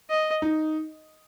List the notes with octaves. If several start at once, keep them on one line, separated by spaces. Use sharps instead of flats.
D#5
D#4